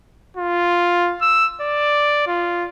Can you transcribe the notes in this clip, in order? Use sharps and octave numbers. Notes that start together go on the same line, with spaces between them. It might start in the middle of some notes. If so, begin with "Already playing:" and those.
F4
E6
D5
F4